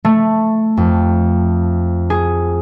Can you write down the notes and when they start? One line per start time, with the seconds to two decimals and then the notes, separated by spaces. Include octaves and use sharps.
0.05 A3
0.77 F2
2.10 G#4